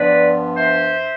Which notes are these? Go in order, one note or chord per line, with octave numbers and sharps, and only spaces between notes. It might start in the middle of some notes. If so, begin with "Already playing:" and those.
Already playing: G2 F3 B3 B4 D5
C5 E5